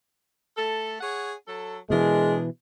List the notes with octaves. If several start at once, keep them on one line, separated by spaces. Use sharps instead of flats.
A3 A4
G#4 C#5 F#5
F#3 A4
B2 E3 G#3 D4 G#4 A#4